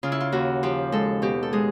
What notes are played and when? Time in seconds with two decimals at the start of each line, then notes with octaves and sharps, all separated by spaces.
0.03 C#3 F4
0.12 E4
0.20 F4
0.32 D#2 F#4
0.63 F3 G4
0.92 G#3 A4
1.22 B2 G4
1.43 A4
1.53 G#3 G#4